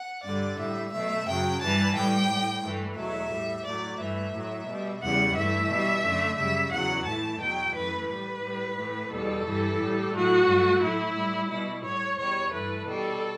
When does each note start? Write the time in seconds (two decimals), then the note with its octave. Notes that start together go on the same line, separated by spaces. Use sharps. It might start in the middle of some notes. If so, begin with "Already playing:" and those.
Already playing: F#5
0.24 G2 D3 G3 D5
0.58 A2 G3 E5
0.92 B2 F#3 A3 E5
1.27 F#2 C#3 F#3 G5
1.60 G2 E3 G3 A5
1.94 A2 G3 G5
2.29 A2 G3
2.63 G2 E3 A3
2.97 E2 B2 F#3 A3 E5
3.31 A2 G3
3.65 A2 F#3 A3 D5
3.99 G2 E3 A3 E5
4.33 A2 F#3 A3
4.67 B2 G3
5.01 E2 C#3 G3 F#5
5.36 G2 E3 A3 E5
5.70 B2 G3
6.04 F#2 D3 A3
6.38 F#2 C#3 G3 E5
6.72 E2 C#3 F#3 F#5
7.06 A2 E3 A3 A5
7.41 E2 B2 F#3 G5
7.74 F#2 E3 A3 B4
8.09 A2 G3 B4
8.43 A2 G3
8.77 A2 E3 A3
9.10 E2 B2 G3 A4
9.46 G2 E3 G3
9.79 A2 G3
10.13 A2 F#3 A3 F#4
10.48 G2 F#3 A3
10.82 A2 F#3 A3 E4
11.16 A2 G3
11.50 B2 G3 E4
11.84 A2 G3 C#5
12.18 E2 B2 G3 C#5
12.52 G2 E3 A3 B4
12.87 B2 G3 A4